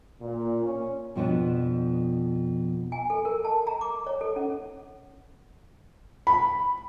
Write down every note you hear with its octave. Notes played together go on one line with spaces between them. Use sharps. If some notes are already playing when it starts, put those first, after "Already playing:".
A#2
C#4
F2 B2 F3 B3 D4
G#5
A4
A#4
A5
A#5
D6
C#5
A4
C#4
B5